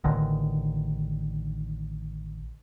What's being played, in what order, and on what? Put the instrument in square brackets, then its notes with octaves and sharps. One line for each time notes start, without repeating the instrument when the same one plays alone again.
[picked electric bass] A1 D3 D#3